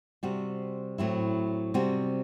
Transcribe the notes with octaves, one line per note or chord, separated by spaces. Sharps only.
C3 G3 C4 F#4
A2 F#3 C4 E4
C3 G3 C4 F#4